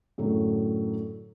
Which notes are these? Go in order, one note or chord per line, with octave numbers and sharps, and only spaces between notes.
F#2 A2 D3 A3